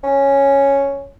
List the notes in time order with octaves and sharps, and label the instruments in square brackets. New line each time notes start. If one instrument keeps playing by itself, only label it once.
[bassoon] C#4